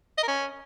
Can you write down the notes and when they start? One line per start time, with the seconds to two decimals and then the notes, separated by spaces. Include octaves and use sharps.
0.18 D#5
0.23 A#4
0.28 C#4